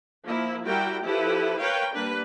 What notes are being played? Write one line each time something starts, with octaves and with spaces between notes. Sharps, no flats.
F3 A#3 E4
G3 E4 F#4 A#4 G5
F3 E4 G4 A4 B4
A#4 B4 C#5 F5 G5
G3 A#3 D4 B4